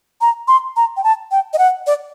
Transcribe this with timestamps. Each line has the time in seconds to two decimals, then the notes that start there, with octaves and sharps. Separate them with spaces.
0.21 A#5
0.48 C6
0.76 A#5
0.97 G5
1.04 A5
1.31 G5
1.53 D#5
1.58 F#5
1.87 D5